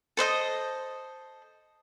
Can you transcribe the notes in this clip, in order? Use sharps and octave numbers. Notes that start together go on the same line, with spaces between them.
A4 C5 D#5 D#6